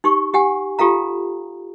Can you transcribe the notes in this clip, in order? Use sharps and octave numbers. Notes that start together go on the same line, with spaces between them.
D#4 G4 C#6
G4 F#5 G#5
F4 G4 A4 F5 A#5